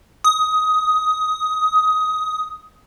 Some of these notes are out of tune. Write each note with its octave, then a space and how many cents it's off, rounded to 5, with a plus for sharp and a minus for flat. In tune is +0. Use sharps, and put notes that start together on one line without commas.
D#6 +15